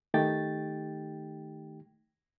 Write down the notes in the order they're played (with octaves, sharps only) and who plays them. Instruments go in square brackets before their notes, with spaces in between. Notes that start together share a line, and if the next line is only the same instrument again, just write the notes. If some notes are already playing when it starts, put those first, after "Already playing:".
[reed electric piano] D#3 A3 D#4 G4 G5 A6